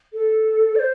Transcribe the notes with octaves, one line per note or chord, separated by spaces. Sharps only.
A4
D5
C5